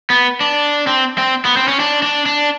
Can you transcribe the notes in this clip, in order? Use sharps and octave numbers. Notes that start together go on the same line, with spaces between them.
B3
D4
C4
C4
B3
C4
C#4
D4
D4
D4